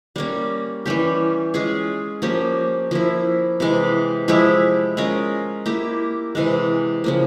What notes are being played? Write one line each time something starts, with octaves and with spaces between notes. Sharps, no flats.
G3 A#3 C#4
E3 G3 C#4 G4
G#3 C#4 F4 G#4
F3 A#3 C#4 G4
F3 A#3 E4
C3 E3 G#3
F3 G#3 E4 G4
G#3 C#4 F4 A#4
A#3 E4 G4
C3 E3 G#3
C#3 F3 A#3